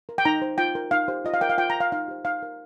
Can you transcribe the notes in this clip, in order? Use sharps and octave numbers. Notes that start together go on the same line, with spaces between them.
A#4
G5
D#4 A#5
C5
F4 G5
A#4
D#4 F5
G4 C5
F4 D#5
F5
A#4 G5
F5
F4 G5
A#5
A#4 F5
D#4 F5
G4 C5
D#4 F5
A#4